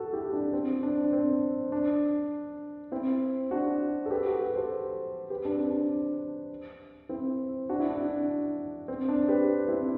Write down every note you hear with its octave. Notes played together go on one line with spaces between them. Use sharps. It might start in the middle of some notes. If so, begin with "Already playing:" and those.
Already playing: F#4 A4
E4 G4
D4
C4
D4
D4
C4
D4
C4 E4
D4 F#4
A4
G4 B4
F#4 A4
G4 B4
A4 C5
G4 B4
D4
C4
D4
C4 E4
D4 F#4
E4
D4
D4
C4
D4
G4 B4
C4 E4